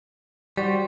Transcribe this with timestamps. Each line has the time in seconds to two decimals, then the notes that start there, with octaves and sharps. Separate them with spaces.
0.57 G3 F#4 C5 D5